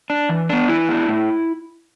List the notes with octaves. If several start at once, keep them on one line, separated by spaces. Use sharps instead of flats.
D4
E3
B3 D4
E3 E4
B3 D4
A2